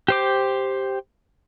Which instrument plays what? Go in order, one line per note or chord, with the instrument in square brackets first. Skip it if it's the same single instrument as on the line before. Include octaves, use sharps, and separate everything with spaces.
[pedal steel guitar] G4 C5 D6